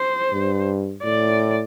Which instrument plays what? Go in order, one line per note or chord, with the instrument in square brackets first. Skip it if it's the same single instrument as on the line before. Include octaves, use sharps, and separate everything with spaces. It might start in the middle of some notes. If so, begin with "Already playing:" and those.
Already playing: [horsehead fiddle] C5
[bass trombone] G2
[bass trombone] A2 [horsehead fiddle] D5